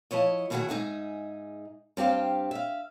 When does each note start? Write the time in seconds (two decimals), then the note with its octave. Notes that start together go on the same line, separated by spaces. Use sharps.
0.11 F3 E4 C#5 D#5
0.50 B2 D#3 F#3 E4 F#4 G#4
0.69 G#2 D#4 G#4 E5
1.97 G2 C4 G4 F5
2.51 E5 F5